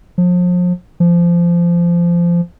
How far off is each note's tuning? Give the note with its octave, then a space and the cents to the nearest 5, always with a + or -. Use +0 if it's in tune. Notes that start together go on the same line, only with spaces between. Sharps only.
F3 +35
F3 -20